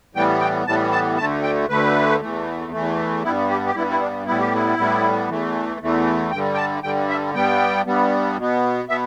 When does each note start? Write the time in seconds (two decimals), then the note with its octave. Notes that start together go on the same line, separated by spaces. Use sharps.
0.15 A2 E3 G3 B3 G5
0.40 G5
0.67 A2 E3 G3 B3 A5
0.92 A5
1.18 D2 D3 A3 A5
1.43 G5
1.69 D2 D3 A3 B4
2.20 E2 E3 A3
2.72 E2 E3 A3
3.24 G2 G3 B3 E4
3.49 G4
3.66 G4
3.75 G2 G3 B3 E4
3.91 E4
4.00 D4
4.26 A2 G3 B3 E4
4.40 G4
4.55 E4
4.77 A2 G3 B3
5.29 E2 E3 A3
5.80 E2 E3 A3
6.31 G2 D3 G3 G5
6.54 G5
6.58 A5
6.83 G2 D3 G3 G5
7.09 E5
7.34 G2 G3 B3 G5
7.86 G2 G3 B3
8.37 B2 B3
8.89 B2 B3 E5